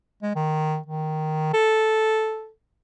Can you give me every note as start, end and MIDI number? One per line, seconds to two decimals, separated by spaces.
0.22 0.34 56
0.35 0.78 51
0.87 1.51 51
1.53 2.49 69